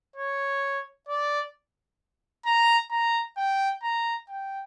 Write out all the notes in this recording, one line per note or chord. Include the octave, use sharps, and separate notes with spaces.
C#5
D5
A#5
A#5
G5
A#5
G5